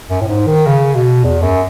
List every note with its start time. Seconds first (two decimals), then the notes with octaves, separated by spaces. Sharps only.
0.10 F#2
0.21 A2
0.28 G#2
0.47 D#3
0.67 C#3
0.96 B2
1.24 E2
1.42 F#2